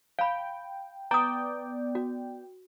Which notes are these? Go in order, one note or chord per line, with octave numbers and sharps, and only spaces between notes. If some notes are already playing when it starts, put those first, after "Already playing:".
F5 G5 B5
B3 D5 G5 A#5 D#6
F#4